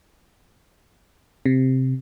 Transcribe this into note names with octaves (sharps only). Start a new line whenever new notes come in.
C3